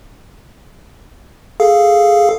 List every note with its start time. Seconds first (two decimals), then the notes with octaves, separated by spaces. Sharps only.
1.60 G#4 A4 F5